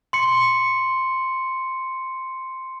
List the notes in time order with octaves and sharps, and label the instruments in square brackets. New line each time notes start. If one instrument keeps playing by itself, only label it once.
[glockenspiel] C6 C#7